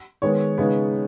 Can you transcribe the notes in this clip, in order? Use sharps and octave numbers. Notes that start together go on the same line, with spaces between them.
D#3 G#3 B3 C#5
C#3 G#3 B3 D#4